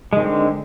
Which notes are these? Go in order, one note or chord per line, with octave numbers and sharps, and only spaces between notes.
D3 D#3 G#3 C4